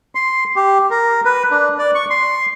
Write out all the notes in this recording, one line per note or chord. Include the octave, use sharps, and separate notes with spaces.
C6
G4
A#4
B4
D4
D5
C#6
C6